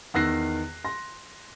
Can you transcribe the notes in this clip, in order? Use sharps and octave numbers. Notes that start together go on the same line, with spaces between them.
E2 D#3 E6 F#6 A#6 C7
C6 A#6